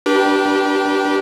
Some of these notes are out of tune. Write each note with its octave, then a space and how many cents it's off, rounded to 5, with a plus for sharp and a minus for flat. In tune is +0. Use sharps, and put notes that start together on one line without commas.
D4 +0 G4 -20 B4 -40